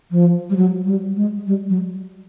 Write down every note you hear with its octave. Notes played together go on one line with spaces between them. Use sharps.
F3
G3
F#3
G3
G#3
G3
F#3